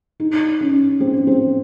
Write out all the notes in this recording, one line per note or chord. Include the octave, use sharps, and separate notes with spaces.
D#4
C#4
C4
C#4
C4